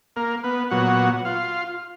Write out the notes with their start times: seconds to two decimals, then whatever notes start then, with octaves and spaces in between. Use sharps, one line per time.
0.16 A#3 A#4
0.44 B3 B4
0.71 A#2 F#3 B3 F#4 F#5
1.25 F4 F5